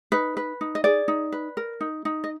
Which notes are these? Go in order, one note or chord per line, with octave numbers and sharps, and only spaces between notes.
D#4 B4
B4
D#4
D#5
G#4 D5
D#4
B4
A#4
D#4
D#4
D#5